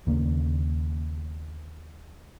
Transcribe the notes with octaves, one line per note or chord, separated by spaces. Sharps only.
D#2 C#3 A#3